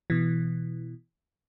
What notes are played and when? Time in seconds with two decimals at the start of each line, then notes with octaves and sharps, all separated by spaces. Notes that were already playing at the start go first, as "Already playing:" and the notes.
0.10 B2 E3